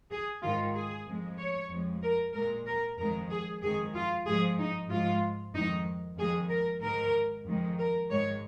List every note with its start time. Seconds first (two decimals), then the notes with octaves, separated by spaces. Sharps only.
0.11 G#4
0.42 G#2 D#3 G#3 F4
0.75 G#4
1.06 F2 F3 G#3
1.38 C#5
1.70 F2 F3 G#3
2.03 A#4
2.34 A#2 G#3 A#4
2.66 A#4
2.98 F2 D#3 G#3 A#4
3.30 G#4
3.62 F2 D#3 G#3 G#4
3.95 F4
4.27 G#2 F3 G#3 G#4
4.58 D#4
4.90 G#2 F3 G#3 F4
5.54 F2 D#3 G#3 D#4
6.17 F2 D#3 G#3 G#4
6.49 A#4
6.82 G#2 D#3 G#3 A#4
7.45 F2 D#3 G#3
7.78 A#4
8.10 G#2 D#3 G#3 C#5